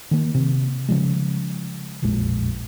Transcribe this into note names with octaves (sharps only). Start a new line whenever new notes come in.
D#3 A#3
C3
C#3 F3 G#3
E1 A#1 F2 G#3